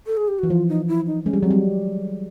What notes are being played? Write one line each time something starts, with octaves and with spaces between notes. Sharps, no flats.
A4
G#4
G4
E3 F#4
F3 F4
D#4
E4
D#4
G#3 C#4
G3
F#3 C4
G3